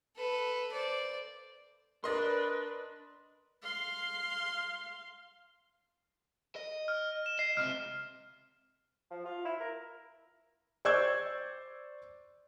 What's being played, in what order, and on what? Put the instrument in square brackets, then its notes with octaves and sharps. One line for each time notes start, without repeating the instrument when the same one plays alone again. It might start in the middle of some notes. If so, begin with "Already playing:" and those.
[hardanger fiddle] A4 B4
C5 D5
[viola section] D4 B4 [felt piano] A#4 A6 [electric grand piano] D#5 C6
[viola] F5 C6
[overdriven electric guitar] D#5
[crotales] F6
E7
[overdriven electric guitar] D#5 [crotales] C7
[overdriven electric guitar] C#2 C3 [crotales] F6
[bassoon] F3
F4
E4
A#4
[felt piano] C5 D5 C#6 E6 G6 G#6